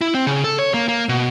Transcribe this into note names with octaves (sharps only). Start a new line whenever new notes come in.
E4
C4
C#3
A4
C#5
A#3
A#3
B2